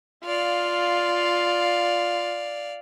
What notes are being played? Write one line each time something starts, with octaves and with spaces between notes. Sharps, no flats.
F4 D5 F5